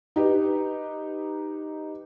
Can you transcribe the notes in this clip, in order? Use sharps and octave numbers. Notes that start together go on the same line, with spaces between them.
D#4 G4 B4